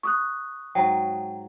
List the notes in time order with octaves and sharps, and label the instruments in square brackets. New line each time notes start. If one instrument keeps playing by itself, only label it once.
[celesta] C#6 D#6 F#6
[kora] G#2 F#3 [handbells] G5 A#5